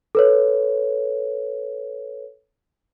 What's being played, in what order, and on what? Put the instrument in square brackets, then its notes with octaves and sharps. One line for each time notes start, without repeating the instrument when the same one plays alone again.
[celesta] A4 B4 C#5